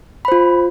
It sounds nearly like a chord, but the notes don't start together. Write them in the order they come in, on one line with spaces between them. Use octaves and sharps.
B5 C5 F4